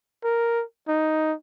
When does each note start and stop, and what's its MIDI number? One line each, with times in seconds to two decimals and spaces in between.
0.24 0.63 70
0.88 1.34 63